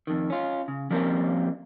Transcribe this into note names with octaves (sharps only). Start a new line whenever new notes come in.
F2 D#3
C#4 F4
C#3
F3 G3 A#3 C4 C#4 A#4